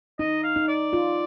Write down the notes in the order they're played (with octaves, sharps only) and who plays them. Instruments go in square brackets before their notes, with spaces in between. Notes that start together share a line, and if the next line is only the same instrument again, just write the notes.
[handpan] D#4 [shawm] D#5
[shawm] F5
[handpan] D#4
[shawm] D5
[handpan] F4